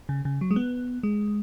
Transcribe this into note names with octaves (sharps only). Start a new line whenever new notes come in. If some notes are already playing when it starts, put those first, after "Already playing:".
C#3
C#3
F#3
G#3
B3
G#3